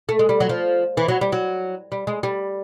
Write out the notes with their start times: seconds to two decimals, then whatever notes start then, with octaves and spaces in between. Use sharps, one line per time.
0.09 A3
0.19 G#3
0.29 G3
0.40 F#3
0.49 F3
0.97 E3
1.08 F#3
1.21 G3
1.32 F#3
1.92 G3
2.07 G#3
2.23 G3